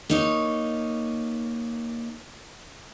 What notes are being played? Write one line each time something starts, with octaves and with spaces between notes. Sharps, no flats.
A#3 D#4 C#5